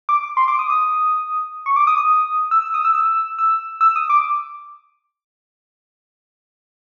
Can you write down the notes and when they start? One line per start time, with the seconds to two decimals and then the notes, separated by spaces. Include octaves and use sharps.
0.09 D6
0.23 D6
0.37 C6
0.48 D6
0.59 D#6
0.70 D#6
1.66 C#6
1.76 D6
1.87 D#6
1.98 D#6
2.51 E6
2.62 E6
2.74 D#6
2.85 E6
2.95 E6
3.39 E6
3.81 E6
3.96 D#6
4.10 D6